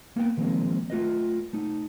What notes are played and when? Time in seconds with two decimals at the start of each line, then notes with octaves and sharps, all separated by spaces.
0.16 A#3 B3 G5
0.37 D#3 F3 G#3 A#3 C4
0.90 A3 F4 B4 D#5
1.53 A3 D#4